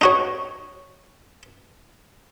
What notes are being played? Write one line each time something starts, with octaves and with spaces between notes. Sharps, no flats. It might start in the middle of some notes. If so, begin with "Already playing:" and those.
D#4 F#4 C#5